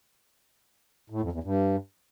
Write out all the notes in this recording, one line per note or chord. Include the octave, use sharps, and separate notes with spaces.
A2
F2
E2
G2